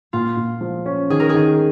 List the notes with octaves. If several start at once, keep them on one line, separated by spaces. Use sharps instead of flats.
A#2 F4
A#2
F3
C#4
D#3 G#4
A#4
G#4
D#3